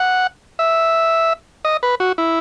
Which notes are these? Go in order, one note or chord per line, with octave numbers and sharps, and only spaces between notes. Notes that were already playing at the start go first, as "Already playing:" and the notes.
Already playing: F#5
E5
D#5
B4
F#4
E4